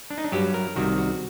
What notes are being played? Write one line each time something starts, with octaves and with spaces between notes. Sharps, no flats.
D4
D#4
D4
G2 F#3 G4
A#4
C2 C3 D#3 F#4
F#4